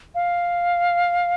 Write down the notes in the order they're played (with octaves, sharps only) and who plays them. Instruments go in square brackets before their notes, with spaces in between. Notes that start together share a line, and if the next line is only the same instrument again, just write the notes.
[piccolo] F5